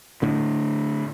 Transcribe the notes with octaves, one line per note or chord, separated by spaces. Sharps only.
A2 D3